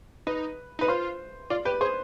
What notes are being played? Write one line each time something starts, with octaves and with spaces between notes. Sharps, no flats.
D#4 B4
D#4 B4
F4 C5
F4 D5
G4 B4
G#4 C5